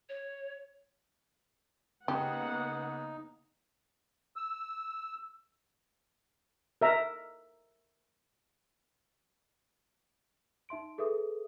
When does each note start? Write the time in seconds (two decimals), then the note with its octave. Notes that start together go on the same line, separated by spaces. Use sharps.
0.09 C#5
2.08 C#3 A#3 B3 D#4 G4 F#5
4.36 E6
6.81 A#4 E5 A#5
10.69 D#4 E5 C6 D7
10.98 G#4 A4 B4 E5 D#6